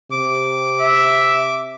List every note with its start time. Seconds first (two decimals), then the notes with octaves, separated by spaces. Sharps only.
0.11 C3 D6
0.81 E5